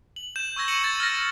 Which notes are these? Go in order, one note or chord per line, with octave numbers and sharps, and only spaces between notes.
F#7
G6 E7
C#6 E6 G#6 A#6
C#7 D#7 E7 F#7
G#6 A6
F6 A#6